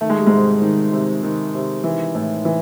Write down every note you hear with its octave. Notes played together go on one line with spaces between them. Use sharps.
D#3 A3
G#3
G3
G#2 C3 G#3
D#3
C3
D#3
C3
E3
A2
E3